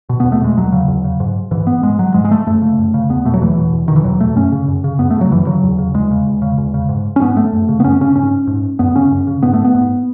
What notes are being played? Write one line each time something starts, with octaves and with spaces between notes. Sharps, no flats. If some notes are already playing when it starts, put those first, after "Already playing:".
B2
E2 B3
A3
B2 G#3
E2 F#3
C#3
E2
C#3
G#2
G#2 E3
B3
G#2 G#3
F#3
G#2 G#3
G#3
A3
F#2 A3
C#3
F#2
C#3
E2 B3
B2 A3
F#3
E2 E3
B2
E2
B2 D#3
E3
E2 F#3
B2 A3
F#2 C#4
C#3
F#2
C#3
F#2 B3
A3
C#3
F#3
F#2 E3
C#3 F#3
E2
C#3
E2 G#3
C#3
E2
C#3
E2
C#3
G#2
C#4
G#2 B3
A3
F#2
C#3
B3
F#2 C#4
C#3 C#4
G#2 C#4
G#2
F#2 B3
C#3 C#4
F#2
C#3
G#2 B3
A3
B3
G#2